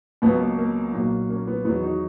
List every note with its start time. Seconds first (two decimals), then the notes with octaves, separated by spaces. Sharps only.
0.22 C#2 B2 F#3 B3
0.39 A#3
0.58 A#3
0.93 B1 A#2 F#3
1.29 A#3 C#4
1.47 B3
1.65 E2 D#3 F#3 B3
1.82 D#4 F#4